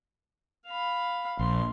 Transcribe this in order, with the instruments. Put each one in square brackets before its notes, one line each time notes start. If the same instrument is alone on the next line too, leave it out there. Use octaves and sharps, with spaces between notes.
[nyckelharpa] F5 B5
[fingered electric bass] A#1 [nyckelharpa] C6